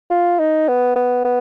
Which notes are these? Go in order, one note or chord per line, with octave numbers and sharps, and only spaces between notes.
F4
D#4
B3
B3
B3